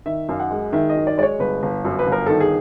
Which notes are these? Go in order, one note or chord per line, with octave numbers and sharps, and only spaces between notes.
D#3 E5
F#2 F5
F#5
G#3
D#3 E5
D#5
F#2
D5
G#3 D5
C#5
G1 B4
G1
F#2
B4
G1
A#4
D#3 A4
G#4